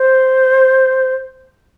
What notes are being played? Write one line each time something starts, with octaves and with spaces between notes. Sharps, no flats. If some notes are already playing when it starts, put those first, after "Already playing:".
Already playing: C5